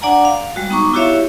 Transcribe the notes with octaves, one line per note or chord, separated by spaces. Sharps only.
D4 D5 F#5 G#5 A#5
F5
G3 G#3 F#4
B3 D#4 A#5 C#6 D6
E4 F#4 G4 C#5 E5 F5